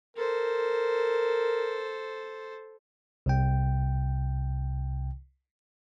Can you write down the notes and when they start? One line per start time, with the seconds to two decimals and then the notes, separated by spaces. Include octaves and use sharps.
0.16 A4 A#4 C5
3.26 C2 C3 G5